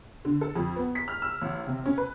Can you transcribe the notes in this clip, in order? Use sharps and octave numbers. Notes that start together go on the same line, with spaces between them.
D3
A4
F2
B3
B6
F6
E6
A1
C3
C#4
B4